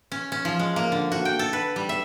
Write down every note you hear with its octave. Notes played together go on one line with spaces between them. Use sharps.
C#4
C#4
F3
G#3
A#3
D3
F#4
G5
A4
B4
G3
E5